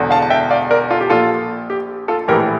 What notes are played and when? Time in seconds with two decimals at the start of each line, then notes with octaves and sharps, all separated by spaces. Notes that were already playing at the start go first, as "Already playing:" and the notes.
Already playing: E1 E2 D3
0.11 F5 A5
0.22 A5
0.30 E5 G5
0.51 D5 F5
0.71 A#4 D5
0.90 F4 A4
1.01 G4
1.10 A#1 A#2 F4 A4
1.70 G4
2.08 F4 A4
2.28 A#1 A2 E3 G4 A#4